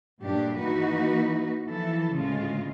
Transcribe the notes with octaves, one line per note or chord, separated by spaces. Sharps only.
G2 A#2 F#3 A3 D4 G4
E3 A#3 D#4 F#4 B4
E3 F3 E4 A4
D2 A2 C#3 G#3 F4